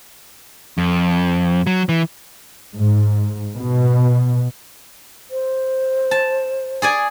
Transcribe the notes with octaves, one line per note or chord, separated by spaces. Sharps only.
F2
F#3
E3
G#2
B2
C5
A5
G#4 D5 G#5